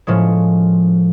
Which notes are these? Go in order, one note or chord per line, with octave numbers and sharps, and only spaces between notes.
A2 F3 G#3 C#4